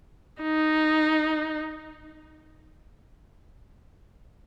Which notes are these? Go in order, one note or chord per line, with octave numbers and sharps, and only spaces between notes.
D#4